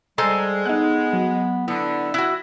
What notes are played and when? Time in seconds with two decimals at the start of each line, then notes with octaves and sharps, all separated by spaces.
0.18 G3 G#3 A4 C5 G#5 A#5
0.65 B3 D#4 F#6
1.13 F#3
1.68 D3 B3 E4
2.14 E4 F#4 F#6 G#6